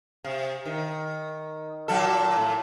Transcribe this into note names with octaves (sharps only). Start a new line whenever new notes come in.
C3
D#3
A#2 F#3 A4
A2